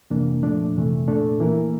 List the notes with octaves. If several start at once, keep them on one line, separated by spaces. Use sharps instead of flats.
F2 C3 E3 A#3 D4
A#2 F3 A3 D4
F2 C3 E3 A3
A#2 A3 D4 A4
E3 A#3 E4 A#4